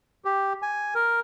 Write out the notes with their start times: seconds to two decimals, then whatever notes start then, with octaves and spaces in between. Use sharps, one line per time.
0.25 G4
0.62 G#5
0.95 A#4